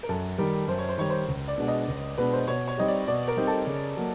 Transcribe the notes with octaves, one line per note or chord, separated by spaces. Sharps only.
A#4
F#2 A4
D#3 G3 A#4
F#2 C5
C#5
C5
D#3 G3 C#5
C5
C#2
D5
B2 G#3 B3 D4
D#5
C#2
B2 G#3 B3 D4 B4
C5
B2 C#5
C#5
G3 C4 D#4 G4 D#5
D5
B2 D5
A#4
G3 C4 D#4 G4
A4
C#3
F#3 A#3